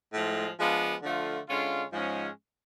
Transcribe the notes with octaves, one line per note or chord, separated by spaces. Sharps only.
A2 F3 G#3
F3 G#3 B3 D4 F4
D3 F3 A3 F4
D3 G#3 C#4 F4
G#2 F3 G#3 C#4